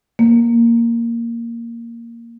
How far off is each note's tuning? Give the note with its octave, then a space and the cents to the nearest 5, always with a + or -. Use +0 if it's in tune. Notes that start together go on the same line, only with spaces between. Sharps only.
A#3 -5